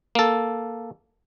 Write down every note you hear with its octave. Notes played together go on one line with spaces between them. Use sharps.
A#3 A4